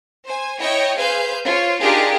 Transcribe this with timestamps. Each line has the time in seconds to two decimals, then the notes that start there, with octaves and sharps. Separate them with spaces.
0.25 C5 G#5
0.59 E4 C#5 D#5 G5
0.96 G#4 B4 C5 F5 G#5 G6
1.45 F4 C5 C#5
1.81 D4 D#4 F4 G4 G#4 A#4